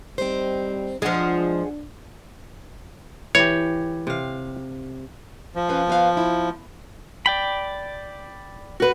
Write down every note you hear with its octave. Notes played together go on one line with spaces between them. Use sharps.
G3 C4 D#4 C5
F3 G#3 D4 G#4 F#5
E3 G4 C#5
C3 F5
F3
C#4 B4 F5
B3 B4 F5
E4
D5 G5 B5
F#4 B4